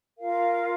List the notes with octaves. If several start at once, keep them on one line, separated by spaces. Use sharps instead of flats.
F4 A#4 F5